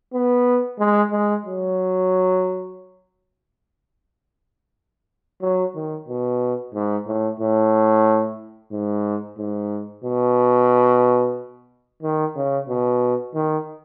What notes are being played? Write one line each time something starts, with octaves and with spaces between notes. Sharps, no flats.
B3
G#3
G#3
F#3
F#3
D#3
B2
G#2
A2
A2
G#2
G#2
B2
D#3
C#3
B2
D#3